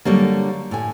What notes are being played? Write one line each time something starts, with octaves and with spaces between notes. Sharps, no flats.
D3 F#3 G3 A#3
A2 G#5